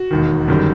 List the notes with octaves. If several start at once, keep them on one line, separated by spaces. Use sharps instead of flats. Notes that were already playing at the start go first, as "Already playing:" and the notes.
Already playing: F#4
E1 D#2 D#3
G1 F#2 D#3 G3